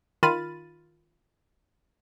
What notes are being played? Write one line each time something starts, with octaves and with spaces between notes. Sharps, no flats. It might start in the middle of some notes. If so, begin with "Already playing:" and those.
D#3 F4 B5 F6 A6 D#7